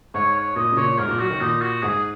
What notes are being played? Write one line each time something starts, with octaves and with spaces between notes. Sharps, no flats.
G#2 C#5
C#5
A#2 D#5
C#3
A#2 C#5
G#2 A#4
A#2
F#3 F#4
D#3
A#2 D#4
F#4
G#2 G#4